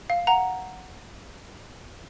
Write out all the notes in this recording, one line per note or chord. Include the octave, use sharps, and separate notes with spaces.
F5
F#5 A#5